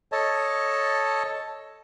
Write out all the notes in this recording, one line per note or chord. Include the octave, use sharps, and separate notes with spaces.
A4 C#5 D#5 A5